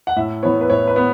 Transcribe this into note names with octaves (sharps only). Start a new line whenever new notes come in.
F#5
A2 E5
E3 B3 C#5
B4
A2 C#5
B4
B3